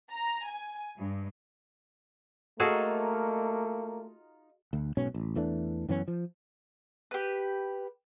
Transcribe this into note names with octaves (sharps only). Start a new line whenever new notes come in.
A#5
G#5
G2
A3 A#3 D#4 F4 F#4 G#4 A4
D2
B1 G#2 B2 C#4
A1
E2 E3 A3 D4
F#2 E3 B3 C#4
F3
G4 B4